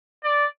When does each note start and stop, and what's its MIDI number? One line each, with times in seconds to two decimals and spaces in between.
0.24 0.45 74